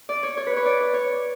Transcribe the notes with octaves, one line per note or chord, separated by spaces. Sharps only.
D5
C#5
C#5
B4
C#5
D5
D5
C#5